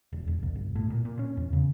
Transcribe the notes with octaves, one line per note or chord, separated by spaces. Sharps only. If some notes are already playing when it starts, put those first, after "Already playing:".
E1
E1
C2
G1
A2
A#2
A#2
C#4
E2
C#3